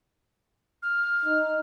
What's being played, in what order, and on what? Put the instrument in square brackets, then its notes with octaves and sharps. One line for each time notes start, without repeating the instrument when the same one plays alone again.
[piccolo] F6
[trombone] D#4